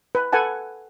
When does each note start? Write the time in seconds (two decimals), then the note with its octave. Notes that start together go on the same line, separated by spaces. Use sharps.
0.15 B4
0.32 A4 B4 F#5 G#5 A5